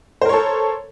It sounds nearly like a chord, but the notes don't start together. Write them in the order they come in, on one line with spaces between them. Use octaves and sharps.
C5 A#4 C#5 A4